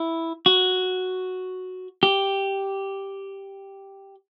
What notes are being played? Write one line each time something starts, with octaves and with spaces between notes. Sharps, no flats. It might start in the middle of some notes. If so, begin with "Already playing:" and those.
Already playing: E4
F#4
G4